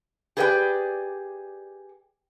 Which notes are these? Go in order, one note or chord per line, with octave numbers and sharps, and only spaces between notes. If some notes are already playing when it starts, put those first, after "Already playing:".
G4 G#4 B4 D5 D#5 G5